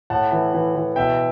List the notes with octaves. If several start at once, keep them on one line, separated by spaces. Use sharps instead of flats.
A2 F#5 A5
E3
E3
E3
B2 E5 G5